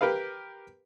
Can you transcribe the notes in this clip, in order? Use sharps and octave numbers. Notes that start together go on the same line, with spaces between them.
G4 A#4 B4 F5